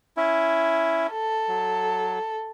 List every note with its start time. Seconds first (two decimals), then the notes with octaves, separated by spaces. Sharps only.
0.17 C#4 E4
1.11 A4
1.48 F#3